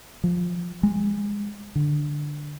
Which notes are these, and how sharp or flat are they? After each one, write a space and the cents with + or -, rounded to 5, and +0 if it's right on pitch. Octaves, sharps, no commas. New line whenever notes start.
F3 +10
G#3 -20
D3 +5